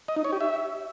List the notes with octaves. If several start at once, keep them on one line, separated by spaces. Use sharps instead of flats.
D#5
D#4
C#5
G4
E5